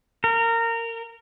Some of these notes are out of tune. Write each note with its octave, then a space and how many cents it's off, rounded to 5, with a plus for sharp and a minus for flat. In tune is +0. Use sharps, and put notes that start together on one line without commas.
A#4 -20